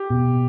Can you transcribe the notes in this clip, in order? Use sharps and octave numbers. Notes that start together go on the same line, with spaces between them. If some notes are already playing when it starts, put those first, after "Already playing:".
Already playing: G4
B2